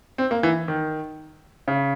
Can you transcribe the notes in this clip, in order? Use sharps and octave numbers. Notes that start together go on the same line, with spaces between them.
C4
A#3
E3
D#3
C#3